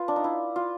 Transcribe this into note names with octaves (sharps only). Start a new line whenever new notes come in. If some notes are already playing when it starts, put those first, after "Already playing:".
Already playing: F4 B4
D4
D#4
E4
F4